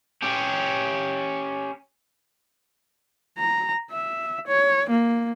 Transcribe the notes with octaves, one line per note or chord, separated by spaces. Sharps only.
C#4 G4
A#5
E5
C#5
A#3